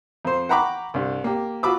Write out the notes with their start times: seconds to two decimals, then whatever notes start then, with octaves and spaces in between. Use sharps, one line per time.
0.25 F2 C5
0.49 F#5 G5 A#5 B5 C#6 D6
0.94 C2 G2
1.24 A#3 G4
1.63 F4 F#4 B5 D6 E6